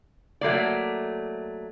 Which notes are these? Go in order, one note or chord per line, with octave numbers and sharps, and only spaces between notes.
F#3 A3 A#3 D5